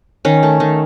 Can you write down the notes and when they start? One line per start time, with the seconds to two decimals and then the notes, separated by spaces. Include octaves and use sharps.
0.25 D#3 C#4
0.43 A3
0.60 D#3